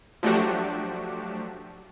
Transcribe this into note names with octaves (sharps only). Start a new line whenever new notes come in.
F3 F#3 A3 D4 F#4 G4